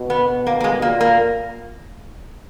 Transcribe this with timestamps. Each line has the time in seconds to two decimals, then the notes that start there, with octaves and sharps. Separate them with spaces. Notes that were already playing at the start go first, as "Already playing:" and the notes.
Already playing: B2
0.10 B3
0.47 A#3
0.60 A#3
0.64 G#3
0.82 A#2 A#3
1.01 A#3